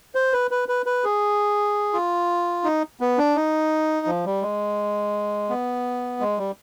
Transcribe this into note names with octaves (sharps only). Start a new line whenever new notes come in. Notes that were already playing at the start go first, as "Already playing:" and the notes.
C5
B4
B4
B4
B4
G#4
F4
D#4
B3
D4
D#4
F3
G3
G#3
B3
G#3
G3